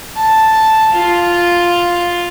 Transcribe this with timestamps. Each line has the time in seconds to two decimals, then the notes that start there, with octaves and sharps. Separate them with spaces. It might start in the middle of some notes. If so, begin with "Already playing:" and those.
0.17 A5
0.93 F4